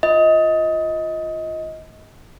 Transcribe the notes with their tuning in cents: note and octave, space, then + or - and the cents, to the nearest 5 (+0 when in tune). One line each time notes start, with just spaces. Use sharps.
F4 +5 D#5 +20